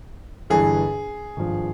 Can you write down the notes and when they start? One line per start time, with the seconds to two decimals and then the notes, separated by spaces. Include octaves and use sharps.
0.50 G1 G2 E3 G#4
1.36 G#1 G2 F3